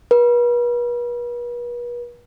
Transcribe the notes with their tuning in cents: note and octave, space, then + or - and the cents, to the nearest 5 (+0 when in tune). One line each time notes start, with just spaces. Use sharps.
B4 -40